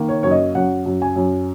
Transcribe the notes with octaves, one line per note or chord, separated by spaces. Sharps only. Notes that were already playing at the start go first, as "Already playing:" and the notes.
Already playing: D#3 A#3
C#5
F#2 C#5
D#5
F#2 F#5
F#2
G#5
F#2